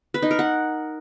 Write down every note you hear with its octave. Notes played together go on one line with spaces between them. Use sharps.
B4
D#4
A#4
F#5